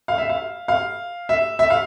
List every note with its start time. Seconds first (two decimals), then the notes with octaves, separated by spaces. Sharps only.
0.08 F5
0.18 E5
0.29 F5
0.68 F5
1.29 E5
1.59 E5
1.70 F5